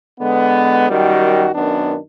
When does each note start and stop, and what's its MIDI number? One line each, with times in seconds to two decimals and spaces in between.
0.20 0.89 50
0.20 0.89 56
0.20 0.89 59
0.90 1.50 42
0.90 1.50 51
0.90 1.50 55
0.90 1.50 66
1.55 1.97 42
1.55 1.97 51
1.55 1.97 59
1.55 1.97 62